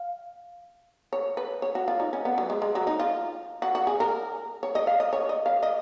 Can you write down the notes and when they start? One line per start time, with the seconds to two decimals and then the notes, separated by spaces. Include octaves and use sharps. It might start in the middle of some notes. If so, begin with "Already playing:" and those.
Already playing: F5
1.13 C#5
1.37 B4
1.62 C#5
1.75 F#4
1.88 F4
2.00 D#4
2.13 C#4
2.25 B3
2.38 F#3
2.50 G#3
2.62 G#3
2.75 F#3
2.87 D#4
2.99 F4
3.62 F#4
3.75 F#4
3.87 G#4
4.00 A#4
4.63 C#5
4.75 D#5
4.87 F5
5.00 D#5
5.13 C#5
5.29 D#5
5.46 F5
5.63 D#5